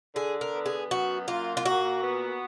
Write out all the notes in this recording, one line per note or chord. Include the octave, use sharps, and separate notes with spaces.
D3 G#4
A#4
B3
G#4
F#2 F#4
A#3 F4
F4
A#2 F#4
B3